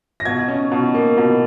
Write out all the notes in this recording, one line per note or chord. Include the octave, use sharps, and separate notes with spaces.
A#6
B2 G#6
C#4
B2
A#3
B2